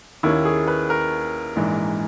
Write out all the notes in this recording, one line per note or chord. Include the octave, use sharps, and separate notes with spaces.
D#2 D#3 A#3 C#4 E4
G#4
B4
A#4
A#1 G#2 E3